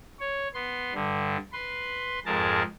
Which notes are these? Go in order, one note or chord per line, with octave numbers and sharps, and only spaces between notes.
C#5
B3 C6
G2 D3
B4 C6
F2 G#2 G#4 A#4 A5